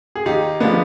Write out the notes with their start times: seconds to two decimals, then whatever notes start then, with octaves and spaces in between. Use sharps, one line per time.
0.16 G#4
0.26 D#2 D#4 G4
0.60 D3 F3 G#3 B3 D4